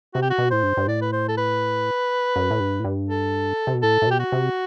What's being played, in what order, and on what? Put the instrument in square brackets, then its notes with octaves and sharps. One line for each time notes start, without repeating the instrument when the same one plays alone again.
[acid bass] C3 [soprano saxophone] F#4
[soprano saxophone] G4
F#4
[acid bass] B2
[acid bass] A2 [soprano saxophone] C5
[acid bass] G2
G2
[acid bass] A2 [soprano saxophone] D5
[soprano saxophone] B4
C5
A4
B4
[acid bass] F#2
A2
G2
A2
G2
[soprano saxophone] A4
[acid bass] C3
B2
[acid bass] A2 [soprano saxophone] A4
[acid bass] A2
[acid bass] B2 [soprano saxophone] G4
[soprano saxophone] F#4
[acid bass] C3